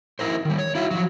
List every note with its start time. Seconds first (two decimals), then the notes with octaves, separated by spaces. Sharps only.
0.19 D#4 E4 A#4 C5
0.45 D#3 G3
0.58 C#5
0.75 D#4 E4 F#4 E5 F5
0.91 F3 F#3